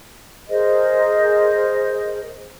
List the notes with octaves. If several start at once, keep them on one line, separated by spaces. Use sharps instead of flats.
G#4 A#4 C5 D#5